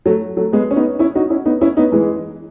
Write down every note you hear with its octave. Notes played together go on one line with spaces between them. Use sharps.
F#3 A3
F#3 A3
G#3 B3
C#4
B3 D#4
C#4 E4
D#4 F#4
C#4 E4
B3 D#4
C#4 E4
B3 D#4
E3 G#3